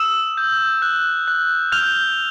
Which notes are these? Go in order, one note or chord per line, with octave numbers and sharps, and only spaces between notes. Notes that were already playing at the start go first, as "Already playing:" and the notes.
Already playing: D#6 E6 E7
G6
F#6
F#6
F6 G6 F7